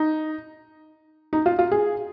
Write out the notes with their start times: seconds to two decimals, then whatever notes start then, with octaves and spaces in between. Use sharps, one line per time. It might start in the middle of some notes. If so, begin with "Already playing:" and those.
Already playing: D#4
1.33 D#4
1.46 F4
1.59 F4
1.72 G#4